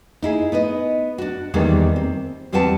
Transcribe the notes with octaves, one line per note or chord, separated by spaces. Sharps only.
D#4 E4 G#4
B3 D#4 B4 D#5
D4 F#4
E2 D#3 G3 G#3 A#3 B3
C4
E2 G3 C4 B4 F#5 A5